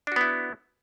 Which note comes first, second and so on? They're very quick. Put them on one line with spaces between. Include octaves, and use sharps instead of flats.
D4 F#4 B3 E4